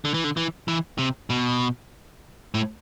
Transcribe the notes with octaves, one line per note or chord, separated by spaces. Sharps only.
D3
E3
D3
E3
E3
C3
B2
A2